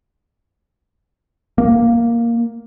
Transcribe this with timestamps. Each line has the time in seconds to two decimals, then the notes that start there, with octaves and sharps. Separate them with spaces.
1.58 A#3